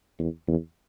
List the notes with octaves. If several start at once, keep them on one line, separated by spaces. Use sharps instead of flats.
E2
E2